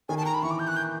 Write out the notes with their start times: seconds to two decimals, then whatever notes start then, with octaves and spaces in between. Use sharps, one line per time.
0.09 D#3 G#5
0.18 A5
0.26 A#5
0.34 B5
0.43 E3 C#6
0.51 D6
0.59 G6
0.68 F#6
0.76 G6